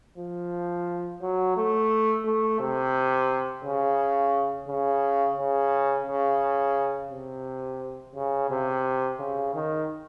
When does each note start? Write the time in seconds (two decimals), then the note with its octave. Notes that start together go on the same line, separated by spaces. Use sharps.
0.18 F3
1.22 F#3
1.57 A3
2.25 A3
2.60 C3
3.64 C#3
4.68 C#3
5.38 C#3
6.07 C#3
7.11 C3
8.15 C#3
8.50 C3
9.19 C#3
9.54 D#3